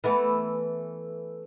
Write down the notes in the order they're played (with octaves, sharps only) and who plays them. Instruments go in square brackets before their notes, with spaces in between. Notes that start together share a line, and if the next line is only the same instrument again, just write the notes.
[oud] E3 A3 B3